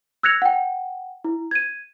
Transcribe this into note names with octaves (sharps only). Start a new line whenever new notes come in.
E6 F#6 G#6 A#6 C#7 F7
F#5 G5
E4
G#6 D#7